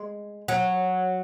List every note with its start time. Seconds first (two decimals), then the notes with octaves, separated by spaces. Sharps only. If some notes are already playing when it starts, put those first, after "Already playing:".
Already playing: G#3
0.48 F#3